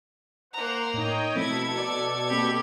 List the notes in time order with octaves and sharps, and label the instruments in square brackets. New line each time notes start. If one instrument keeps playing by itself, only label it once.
[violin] A#3 A#5 [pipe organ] C5 F#5
[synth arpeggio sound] A2 D#4 [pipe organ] C#5 D#5 G5
[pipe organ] B2 A4 G#6 [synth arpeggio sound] F3 A3 C4 [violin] E4
[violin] D5 [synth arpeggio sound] A#5
[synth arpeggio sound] A#3 C4 E6 [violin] G4 B5